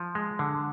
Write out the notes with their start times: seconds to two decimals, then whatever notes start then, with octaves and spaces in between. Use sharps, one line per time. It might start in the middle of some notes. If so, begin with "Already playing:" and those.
Already playing: F3
0.15 G#3
0.39 D3